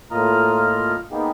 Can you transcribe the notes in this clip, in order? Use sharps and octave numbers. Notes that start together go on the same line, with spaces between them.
A2 A#3 F4 D#5 A#5 F6
A#3 B3 D#4 G4 G#4